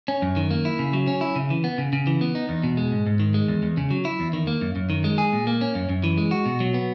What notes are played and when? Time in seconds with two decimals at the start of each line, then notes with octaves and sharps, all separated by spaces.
0.08 C#4
0.22 F#2
0.36 D#3
0.51 A#3
0.65 E4
0.79 C#3
0.93 F#3
1.07 C#4
1.21 E4
1.36 C#3
1.50 E3
1.64 B3
1.78 C#3
1.93 C#3
2.07 E3
2.21 B3
2.35 D#4
2.49 E2
2.63 B2
2.77 G#3
2.92 G#2
3.06 G#2
3.20 D#3
3.34 G#3
3.48 E2
3.63 E2
3.77 C#3
3.91 F#3
4.05 E4
4.20 E2
4.33 D#3
4.47 A#3
4.61 F#2
4.76 F#2
4.90 D#3
5.04 G#3
5.18 G#4
5.33 A#2
5.47 A#3
5.61 C#4
5.75 F#2
5.89 F#2
6.04 E3
6.17 G#3
6.31 F#4
6.45 B2
6.60 F#3
6.74 B3